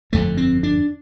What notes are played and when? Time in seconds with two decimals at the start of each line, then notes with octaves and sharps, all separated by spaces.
0.12 G1 F2 D3 A3
0.37 C4
0.63 D4